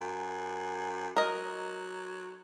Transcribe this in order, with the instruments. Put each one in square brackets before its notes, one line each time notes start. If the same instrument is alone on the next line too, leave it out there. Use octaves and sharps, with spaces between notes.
[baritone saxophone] F#2
[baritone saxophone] F#3 [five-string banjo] A#4 D#5